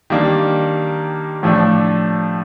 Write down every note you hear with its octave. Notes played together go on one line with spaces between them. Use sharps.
D#3 G3 A#3 D4
A2 F3 A3 D4